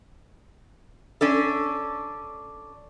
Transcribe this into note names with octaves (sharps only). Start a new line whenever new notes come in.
C#4 D4 A4